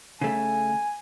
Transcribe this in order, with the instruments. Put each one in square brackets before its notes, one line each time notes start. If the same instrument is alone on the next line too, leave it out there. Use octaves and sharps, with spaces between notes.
[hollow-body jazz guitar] C#3 A3 [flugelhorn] G#5